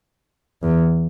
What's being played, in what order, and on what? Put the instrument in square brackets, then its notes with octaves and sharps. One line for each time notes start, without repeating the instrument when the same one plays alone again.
[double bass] E2